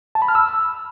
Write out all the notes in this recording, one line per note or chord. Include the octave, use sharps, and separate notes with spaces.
A5
B5
F6
E6